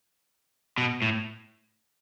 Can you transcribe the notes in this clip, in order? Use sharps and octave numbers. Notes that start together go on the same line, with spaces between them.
B2
A2